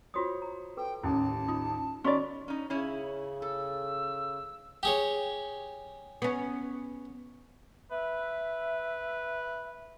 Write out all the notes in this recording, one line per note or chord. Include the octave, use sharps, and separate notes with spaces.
F4 F#4 C5 C#5 D#6
A#5
A4 B4 G5
A1 D#2 C#4 E4 A5
D#4 F4
D#3 C#4 F#4 D5 D#5 B5
C#4 D#4
C#3 C#4 E4 C#5
A4 E6
G4 G#4 C#5
B3 C#4
B4 E5